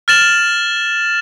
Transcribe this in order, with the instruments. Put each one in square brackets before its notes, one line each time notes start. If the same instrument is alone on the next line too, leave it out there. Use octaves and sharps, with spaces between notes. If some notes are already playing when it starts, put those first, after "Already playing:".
[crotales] F6 A6 E7 F#7